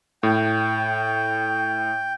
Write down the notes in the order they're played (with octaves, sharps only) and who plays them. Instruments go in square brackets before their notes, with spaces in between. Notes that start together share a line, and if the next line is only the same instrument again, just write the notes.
[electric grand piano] A2 [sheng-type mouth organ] G5